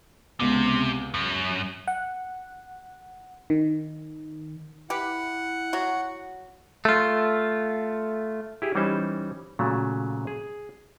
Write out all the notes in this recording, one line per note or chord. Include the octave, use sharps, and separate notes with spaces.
C#2 C3 B3
F#2
F#5
D#3
E4 G4 B4 F#5
F#3 F#4
A3 F4
E4 G4 G#4
E3 G3 C#4 D#4 C5
A#2 C#3 F#3 A3
G#4